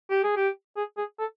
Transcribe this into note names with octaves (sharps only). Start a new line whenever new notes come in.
G4
G#4
G4
G#4
G#4
A4